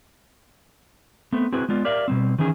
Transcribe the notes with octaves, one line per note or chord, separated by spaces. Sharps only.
A3 B3 C4
C4 E4 F#4 G#4 B4
G#3 B3 F4 D5
G4 A#4 D5 E5 F5
B2 G3 C4
D#3 E3 C#4 G#4